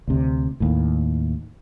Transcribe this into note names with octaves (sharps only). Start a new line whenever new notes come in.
D2 C3
D#2 A2